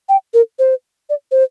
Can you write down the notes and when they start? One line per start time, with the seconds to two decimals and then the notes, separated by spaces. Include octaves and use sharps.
0.09 G5
0.34 A#4
0.59 C5
1.10 D5
1.31 C5